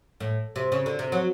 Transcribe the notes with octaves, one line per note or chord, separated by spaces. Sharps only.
A2
C3
C#3
D3
C3
F#3